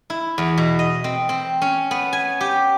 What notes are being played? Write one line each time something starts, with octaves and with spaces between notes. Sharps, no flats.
E4
E2
B2
D#5
C4
C4
C#4
B3
G#5
G4